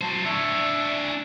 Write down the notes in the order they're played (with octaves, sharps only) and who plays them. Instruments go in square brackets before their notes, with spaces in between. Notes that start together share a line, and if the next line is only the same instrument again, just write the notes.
[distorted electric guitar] F#3 C5 [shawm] A5
[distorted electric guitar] D4 C#5 [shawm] E5
[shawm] G#5